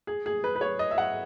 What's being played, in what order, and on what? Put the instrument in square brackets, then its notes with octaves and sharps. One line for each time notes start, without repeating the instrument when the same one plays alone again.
[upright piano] G#4
G#4
B4
B4
C#5
D#5
E5
F#5